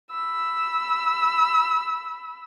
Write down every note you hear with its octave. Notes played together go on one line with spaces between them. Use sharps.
B5 E6